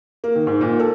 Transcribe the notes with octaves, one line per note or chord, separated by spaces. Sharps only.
A#3
D#3
G#2
A#2
A4